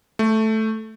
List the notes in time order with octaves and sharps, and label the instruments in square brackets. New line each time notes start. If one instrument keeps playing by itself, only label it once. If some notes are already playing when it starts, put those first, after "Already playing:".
[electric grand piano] A3